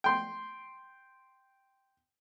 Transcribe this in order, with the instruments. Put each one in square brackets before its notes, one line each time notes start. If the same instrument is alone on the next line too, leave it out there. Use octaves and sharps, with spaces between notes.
[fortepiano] G5 C6